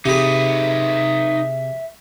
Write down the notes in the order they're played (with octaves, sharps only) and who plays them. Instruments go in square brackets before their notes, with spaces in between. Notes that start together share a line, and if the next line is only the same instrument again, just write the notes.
[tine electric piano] C3 [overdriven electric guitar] D#4 B4 [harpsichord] G4 G#4 [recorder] E5